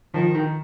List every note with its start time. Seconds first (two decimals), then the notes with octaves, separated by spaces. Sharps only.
0.14 D#3 F3
0.35 D#3